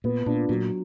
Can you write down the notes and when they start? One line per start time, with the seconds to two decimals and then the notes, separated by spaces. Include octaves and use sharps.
0.04 A#2 B3
0.26 A#2 D4 F4
0.49 A#2 F#3